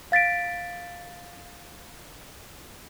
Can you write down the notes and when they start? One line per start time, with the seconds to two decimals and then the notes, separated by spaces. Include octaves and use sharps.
0.12 F5 A6 B6 D7